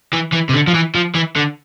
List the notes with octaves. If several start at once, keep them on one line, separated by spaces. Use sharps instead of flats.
E3
E3
C3
D3
F3
E3
F3
E3
D3